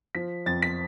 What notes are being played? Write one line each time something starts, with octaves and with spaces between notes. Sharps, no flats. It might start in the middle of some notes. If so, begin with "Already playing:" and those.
F3 B6
F2 A6
B6